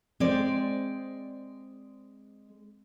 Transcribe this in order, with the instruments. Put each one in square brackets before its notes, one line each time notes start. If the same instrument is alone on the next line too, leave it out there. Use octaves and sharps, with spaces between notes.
[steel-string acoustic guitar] G#3 D5 [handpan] C4 C5